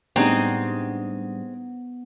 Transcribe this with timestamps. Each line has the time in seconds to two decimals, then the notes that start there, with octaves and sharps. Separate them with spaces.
0.16 A2 G3 G#3 B3 C4 D4 D#4 A#5